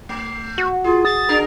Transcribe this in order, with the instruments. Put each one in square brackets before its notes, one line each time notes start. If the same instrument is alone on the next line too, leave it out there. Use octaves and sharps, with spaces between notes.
[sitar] A3
[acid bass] F#4
[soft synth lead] F4 [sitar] G#4
[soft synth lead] D#6 [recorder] A6
[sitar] D4 G#4 A#4